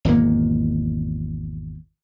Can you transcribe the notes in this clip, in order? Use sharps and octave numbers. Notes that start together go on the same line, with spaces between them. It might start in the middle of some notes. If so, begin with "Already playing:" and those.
G#1 E2 B2 A#3